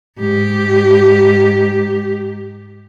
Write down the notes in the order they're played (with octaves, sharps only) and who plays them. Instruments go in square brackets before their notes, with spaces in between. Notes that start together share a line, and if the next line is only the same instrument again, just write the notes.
[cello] G#2 G4